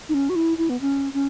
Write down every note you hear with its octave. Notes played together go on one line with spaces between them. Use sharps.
D#4
C#4
F#4
E4
E4
B3
C#4
C#4